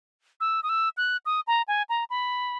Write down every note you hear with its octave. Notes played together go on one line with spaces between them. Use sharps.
E6
D#6
E6
F#6
D#6
A#5
G#5
A#5
B5